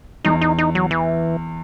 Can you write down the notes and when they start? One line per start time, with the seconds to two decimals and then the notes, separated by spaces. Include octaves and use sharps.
0.24 E2 D#4
0.41 D#4
0.58 D#4
0.75 F#3
0.91 E3